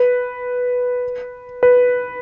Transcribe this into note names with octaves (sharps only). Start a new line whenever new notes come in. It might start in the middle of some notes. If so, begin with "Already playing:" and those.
Already playing: B4
B4